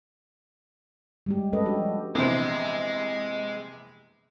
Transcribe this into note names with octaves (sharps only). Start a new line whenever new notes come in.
G3 G#3 G4
G#3 A3 C#4 A4 B4 D#5
F3 D4 F#4 G4
A#1 C3 E3 G#3 B3 C5